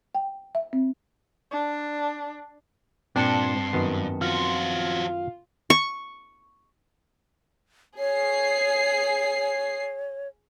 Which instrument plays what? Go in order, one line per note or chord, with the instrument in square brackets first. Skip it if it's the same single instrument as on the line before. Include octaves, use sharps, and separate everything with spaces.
[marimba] G5
E5
C4
[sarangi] D4
[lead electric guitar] G2 [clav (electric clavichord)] A#2 D4 [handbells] C4 A5 C#7 [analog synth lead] C6
[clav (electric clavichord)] F#2 D#3 B3
[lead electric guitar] F3 F#4 [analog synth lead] F4
[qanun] C#6
[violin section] G#4 C7 [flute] C#5